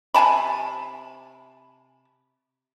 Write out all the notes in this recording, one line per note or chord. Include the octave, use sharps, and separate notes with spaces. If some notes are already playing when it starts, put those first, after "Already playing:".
C3 G#5 A5 B5